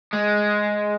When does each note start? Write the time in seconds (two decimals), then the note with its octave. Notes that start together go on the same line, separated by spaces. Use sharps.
0.13 G#3